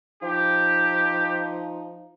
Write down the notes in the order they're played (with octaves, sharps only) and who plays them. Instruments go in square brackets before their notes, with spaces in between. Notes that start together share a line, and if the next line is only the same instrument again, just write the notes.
[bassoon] F3 [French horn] D#4 [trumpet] G4